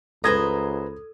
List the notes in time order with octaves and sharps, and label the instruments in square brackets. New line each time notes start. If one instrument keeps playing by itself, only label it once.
[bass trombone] C#2 [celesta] A4 [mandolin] B4 C5 A#5 [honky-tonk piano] D#6 G#6